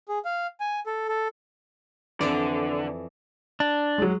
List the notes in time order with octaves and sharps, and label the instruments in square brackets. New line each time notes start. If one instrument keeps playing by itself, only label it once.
[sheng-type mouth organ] G#4
F5
G#5
A4
A4
[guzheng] F2 E3 D5 [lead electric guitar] D3
[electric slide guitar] D4
[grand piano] F#3 G#3